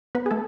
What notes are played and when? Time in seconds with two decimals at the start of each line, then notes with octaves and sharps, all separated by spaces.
0.15 B3 B4
0.26 G#4
0.31 A3 A4